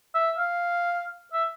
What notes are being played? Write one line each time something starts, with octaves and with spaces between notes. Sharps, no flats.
E5
F5
E5